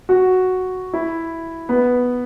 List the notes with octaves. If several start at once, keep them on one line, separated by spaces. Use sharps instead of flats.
F#4
E4
B3